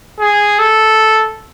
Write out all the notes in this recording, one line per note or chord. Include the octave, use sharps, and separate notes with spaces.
G#4
A4